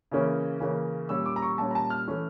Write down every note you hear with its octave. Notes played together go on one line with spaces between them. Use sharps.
C#3 E3 A#3 C#4
C#3 E3 A#3 C#4
A#2 G3 C#4 E6
D6
A#5
C#6
A#2 G3 C#4 A5
A#5
A5
F6
E3 A3 C#4